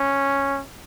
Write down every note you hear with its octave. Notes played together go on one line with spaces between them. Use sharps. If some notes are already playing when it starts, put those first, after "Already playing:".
Already playing: C#4